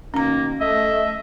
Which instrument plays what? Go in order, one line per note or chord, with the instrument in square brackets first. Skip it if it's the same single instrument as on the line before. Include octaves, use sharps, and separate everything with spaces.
[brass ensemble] B2 D#3 [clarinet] A#3 [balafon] C#4 A#5
[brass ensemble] A3 [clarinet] D#5 [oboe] E5